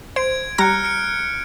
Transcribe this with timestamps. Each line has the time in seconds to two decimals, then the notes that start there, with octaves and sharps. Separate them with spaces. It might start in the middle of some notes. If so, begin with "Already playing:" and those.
0.16 C5 G#6 D7
0.58 G3 A#5 F6 F#6 A#6 C#7
0.83 F6 C#7 D7